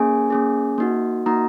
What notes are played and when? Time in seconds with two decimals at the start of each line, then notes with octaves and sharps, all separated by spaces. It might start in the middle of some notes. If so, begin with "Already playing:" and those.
Already playing: A#3 C#4 G#4 G#5
0.30 A#3 C#4 G#4
0.78 A#3 D#4 F#4
1.26 A#3 D#4 F#4 A#5